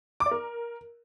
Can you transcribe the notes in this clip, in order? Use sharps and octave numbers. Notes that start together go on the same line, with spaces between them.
D6
D5
A#4